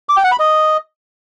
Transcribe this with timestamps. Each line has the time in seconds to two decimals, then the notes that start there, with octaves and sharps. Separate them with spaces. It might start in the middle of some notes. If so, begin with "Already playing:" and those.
0.09 D6
0.17 G5
0.24 F#5
0.32 B5
0.39 D#5